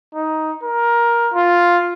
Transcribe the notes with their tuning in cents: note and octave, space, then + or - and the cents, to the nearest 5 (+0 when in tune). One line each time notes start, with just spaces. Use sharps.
D#4 +10
A#4 +15
F4 +0